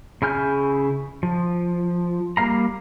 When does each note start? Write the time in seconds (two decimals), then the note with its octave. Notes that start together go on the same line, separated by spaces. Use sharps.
0.22 C#3 E4 G#5 F6 G6
1.23 F3
2.37 G3 A#3 F5 A#5